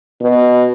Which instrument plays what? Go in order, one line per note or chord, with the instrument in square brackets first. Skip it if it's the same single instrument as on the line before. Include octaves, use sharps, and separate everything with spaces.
[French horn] B2